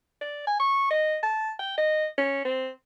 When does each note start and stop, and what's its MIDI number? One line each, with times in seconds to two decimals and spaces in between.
0.21 0.43 74
0.47 0.56 80
0.60 0.88 85
0.91 1.18 75
1.23 1.51 81
1.59 1.77 79
1.78 2.06 75
2.18 2.45 61
2.45 2.69 60